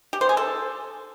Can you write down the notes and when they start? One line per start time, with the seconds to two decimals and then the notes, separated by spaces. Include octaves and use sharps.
0.13 G4
0.21 C5
0.29 G#4
0.37 A4